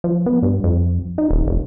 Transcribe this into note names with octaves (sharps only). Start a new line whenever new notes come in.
F3
B3
G2
F2
D#4
D#1
F1